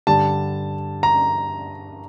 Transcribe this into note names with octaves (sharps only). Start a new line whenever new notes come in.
G2 D3 G3 A5
A#5